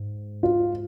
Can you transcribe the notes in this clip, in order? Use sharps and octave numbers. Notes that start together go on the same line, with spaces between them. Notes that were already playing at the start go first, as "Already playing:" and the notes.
Already playing: G#2
F4